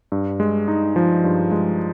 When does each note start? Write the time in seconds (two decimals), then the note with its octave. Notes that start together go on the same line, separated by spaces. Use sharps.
0.12 G2
0.40 G#3
0.68 D#4
0.96 F3
1.24 G2
1.51 G#3